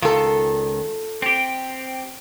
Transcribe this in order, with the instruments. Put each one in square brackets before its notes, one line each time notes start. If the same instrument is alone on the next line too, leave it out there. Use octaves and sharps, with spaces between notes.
[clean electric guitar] C#2 D#3 [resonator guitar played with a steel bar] F4 A4
[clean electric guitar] C4 G4